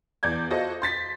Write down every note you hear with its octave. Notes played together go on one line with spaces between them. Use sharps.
E2 D5 G6 G#6
F4 F#4 A4 C5 D#5
C6 A6 B6